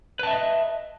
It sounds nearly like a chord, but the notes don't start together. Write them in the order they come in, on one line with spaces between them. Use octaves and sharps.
B4 A5 E5 D#5